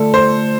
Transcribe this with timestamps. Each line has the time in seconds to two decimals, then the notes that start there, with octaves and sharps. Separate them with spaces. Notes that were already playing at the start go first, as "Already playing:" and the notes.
Already playing: D3 A3 F4 A4
0.14 C5